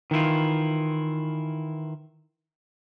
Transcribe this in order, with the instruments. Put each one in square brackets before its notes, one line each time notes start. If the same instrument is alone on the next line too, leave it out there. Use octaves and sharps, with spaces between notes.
[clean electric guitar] D#3 E3 E4 F4